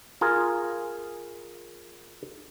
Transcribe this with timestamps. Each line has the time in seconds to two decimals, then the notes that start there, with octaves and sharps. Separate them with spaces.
0.21 F4 G#4 A#4